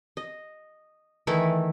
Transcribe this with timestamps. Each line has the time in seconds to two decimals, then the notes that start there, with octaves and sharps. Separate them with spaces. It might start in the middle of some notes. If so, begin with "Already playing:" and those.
0.17 D#5
1.27 D#3 E3 A3 E4